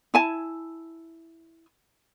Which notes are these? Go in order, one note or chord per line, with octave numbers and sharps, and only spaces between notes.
E4 G#5 A5